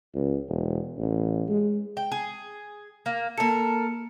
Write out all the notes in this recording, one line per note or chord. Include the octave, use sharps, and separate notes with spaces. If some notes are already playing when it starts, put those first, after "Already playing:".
C#2
E1
A1
G#3
G5
G#4
A#3
A#3 A4 A#4 C#7